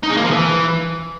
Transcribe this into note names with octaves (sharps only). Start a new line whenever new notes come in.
D#4
G#3
A#3
F3
E3